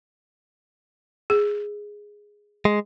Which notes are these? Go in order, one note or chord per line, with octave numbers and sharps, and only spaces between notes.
G#4
G#3